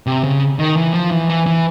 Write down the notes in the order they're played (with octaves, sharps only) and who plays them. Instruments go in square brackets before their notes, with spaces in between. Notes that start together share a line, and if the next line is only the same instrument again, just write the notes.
[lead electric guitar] C3
C#3
D#3
E3
F3
E3
E3
E3